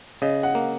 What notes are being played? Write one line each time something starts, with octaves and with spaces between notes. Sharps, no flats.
C#3 D#5
F#5
A#3